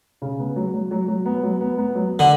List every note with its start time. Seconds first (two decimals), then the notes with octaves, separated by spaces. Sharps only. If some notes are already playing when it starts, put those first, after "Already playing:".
0.22 C#3
0.39 B3
0.56 F#3
0.74 F#3
0.91 F#3
1.08 F#3
1.26 B3
1.43 F#3
1.61 B3
1.78 B3
1.95 F#3
2.19 D3